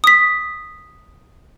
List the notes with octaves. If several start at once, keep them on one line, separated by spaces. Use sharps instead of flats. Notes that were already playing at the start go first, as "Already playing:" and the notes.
D#6 B6